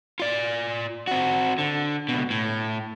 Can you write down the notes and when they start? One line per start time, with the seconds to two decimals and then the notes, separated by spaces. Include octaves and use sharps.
0.20 F4 D5
1.07 C4 F#4
1.58 D3
2.09 C#2 B2
2.30 A2